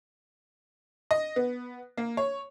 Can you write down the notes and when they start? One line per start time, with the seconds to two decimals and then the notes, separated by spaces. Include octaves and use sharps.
1.11 D#5
1.36 B3
1.98 A#3
2.17 C#5